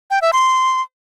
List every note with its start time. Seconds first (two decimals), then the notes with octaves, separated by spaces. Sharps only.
0.11 G5
0.22 E5
0.33 C6